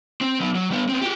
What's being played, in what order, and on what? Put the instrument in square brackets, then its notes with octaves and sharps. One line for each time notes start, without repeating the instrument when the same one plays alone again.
[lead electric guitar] C4
F#3 B3
F#3
G3 B3
B3 C4
F#4 G4